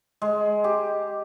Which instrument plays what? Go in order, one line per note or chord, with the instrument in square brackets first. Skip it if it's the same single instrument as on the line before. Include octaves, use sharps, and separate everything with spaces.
[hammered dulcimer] G#3
G4